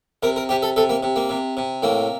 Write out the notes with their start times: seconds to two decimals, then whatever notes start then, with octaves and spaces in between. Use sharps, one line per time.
0.23 C3 A#4
0.36 A#4
0.49 C3 G4
0.62 A4
0.76 C3 A4
0.89 A#3
1.03 C3
1.16 A#3
1.29 C3
1.57 C3
1.83 A2 A#3